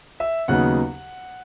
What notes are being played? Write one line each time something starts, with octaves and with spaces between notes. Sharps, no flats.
E5 E6
D#2 C#3 F#3 B3 D#4 F#5 F#6